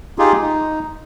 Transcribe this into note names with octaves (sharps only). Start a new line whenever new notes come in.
D#4 F4 G4 G#4
D#4